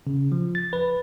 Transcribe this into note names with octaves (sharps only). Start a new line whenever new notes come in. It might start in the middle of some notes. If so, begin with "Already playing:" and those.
C#3
F3
A6
B4